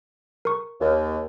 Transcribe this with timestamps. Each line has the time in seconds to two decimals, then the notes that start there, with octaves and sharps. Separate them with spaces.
0.45 A#4 C#6
0.79 D#2